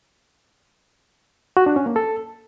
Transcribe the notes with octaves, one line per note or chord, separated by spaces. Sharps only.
F#4
D4
C#4
A#3
A4